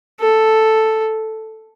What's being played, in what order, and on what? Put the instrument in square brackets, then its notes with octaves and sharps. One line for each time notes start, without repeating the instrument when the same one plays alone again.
[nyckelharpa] A4